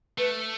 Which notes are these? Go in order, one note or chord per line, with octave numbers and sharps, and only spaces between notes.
A3 B4